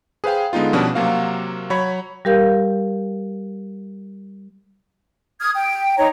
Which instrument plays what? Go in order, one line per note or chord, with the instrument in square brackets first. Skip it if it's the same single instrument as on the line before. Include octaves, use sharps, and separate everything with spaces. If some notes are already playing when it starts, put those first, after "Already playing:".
[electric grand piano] G#4 B4 C5 F5 G5
D3 G#3 B3 D#4 F4
B2 F3 G3 B3 C#4 D4
C3 F#3 A#3 F#4 F5
F#3 C#5 B5 G#6
[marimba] G3 G4 A#4 F5 G6
[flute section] D#6 F6 G#6
G5
D#4 C#5 A#5